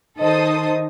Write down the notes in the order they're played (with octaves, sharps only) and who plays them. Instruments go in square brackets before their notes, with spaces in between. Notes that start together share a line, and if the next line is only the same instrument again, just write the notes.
[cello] D#3 [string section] A4 C5 D#6 [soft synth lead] D#5